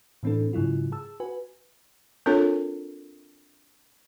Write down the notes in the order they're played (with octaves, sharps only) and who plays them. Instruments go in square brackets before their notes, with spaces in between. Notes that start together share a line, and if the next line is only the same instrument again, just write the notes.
[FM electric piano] A2 E3 C4 D4 A4
G#2 C#3 F#3 E4 F4
G#4 A5 E6
F#4 B4 G#5
[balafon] C4 D4 F4 A4 A#4 C#5